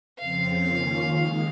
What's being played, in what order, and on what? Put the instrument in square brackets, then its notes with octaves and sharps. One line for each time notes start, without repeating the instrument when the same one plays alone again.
[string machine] F2 C#3 F3 C4 [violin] F5
[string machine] D#3 A#3 C#4 F4
D#2 D#3 G#3 D#4